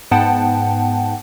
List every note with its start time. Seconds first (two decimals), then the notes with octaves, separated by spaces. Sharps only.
0.11 G#2 B3 F#5 G5 A5